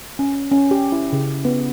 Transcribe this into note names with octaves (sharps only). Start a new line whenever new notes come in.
C#4
C#4
G4
E4
C#3
B3